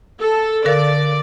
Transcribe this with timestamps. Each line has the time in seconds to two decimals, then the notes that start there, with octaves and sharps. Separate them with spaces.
0.20 A4
0.65 D3 A#4 D5 F5